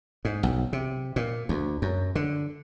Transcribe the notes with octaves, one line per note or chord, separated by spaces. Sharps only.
G#2
B1
C3
A#2
D2
F#2
D3